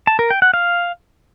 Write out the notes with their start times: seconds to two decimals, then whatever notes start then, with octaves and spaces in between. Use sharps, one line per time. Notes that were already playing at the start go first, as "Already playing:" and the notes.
0.07 A5
0.19 A#4
0.30 G5
0.42 F#5
0.54 F5